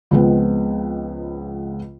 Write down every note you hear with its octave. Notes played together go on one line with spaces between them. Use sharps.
C#2 C#3 F3 G#3 B3 C4